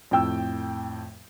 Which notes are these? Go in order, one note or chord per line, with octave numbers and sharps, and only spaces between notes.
F2 A2 G5 E6